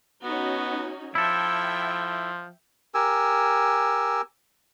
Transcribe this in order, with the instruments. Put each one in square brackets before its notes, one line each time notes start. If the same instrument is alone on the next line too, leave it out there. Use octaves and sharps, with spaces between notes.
[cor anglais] B3 [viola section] C#4 D#4 F#4
[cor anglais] F3 [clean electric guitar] E4 A4 [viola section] E5 G5
[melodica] G4 A#4 G#5 E6